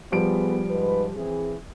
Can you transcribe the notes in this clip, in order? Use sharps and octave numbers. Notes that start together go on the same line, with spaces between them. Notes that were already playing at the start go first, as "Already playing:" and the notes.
F3 G3 B3 G#4 B4 D7
G#2 B4
E3 C4 G#4